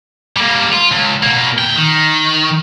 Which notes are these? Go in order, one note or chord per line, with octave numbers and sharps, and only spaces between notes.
G3 A#3
F4
C#2
B2 A#3
A#2 G5
D#3